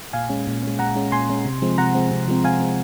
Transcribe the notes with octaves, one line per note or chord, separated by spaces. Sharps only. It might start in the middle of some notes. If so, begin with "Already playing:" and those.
A#2 F5 G#5
G#3 C#4
A#2
G#3 C#4
A#2 F#5 A#5
G#3 C#4
A#2 G#5 C6
G#3 C#4
C3
F3 G#3 C4
C3 F#5 A#5
F3 G#3 C4
C3
F3 G#3 C4
C3 F5 G#5
F3 G#3 C4